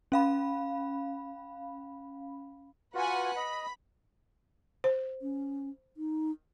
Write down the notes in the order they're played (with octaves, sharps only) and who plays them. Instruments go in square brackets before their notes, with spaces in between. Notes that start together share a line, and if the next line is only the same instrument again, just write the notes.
[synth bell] C#4 F5 B5
[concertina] F4 F#4 [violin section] B4 F#5 G#5
[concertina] D#5 [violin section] B5
[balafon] C5
[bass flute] C#4
D#4